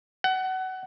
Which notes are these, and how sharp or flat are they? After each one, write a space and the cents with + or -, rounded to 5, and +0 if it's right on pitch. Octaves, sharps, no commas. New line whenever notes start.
F#5 +25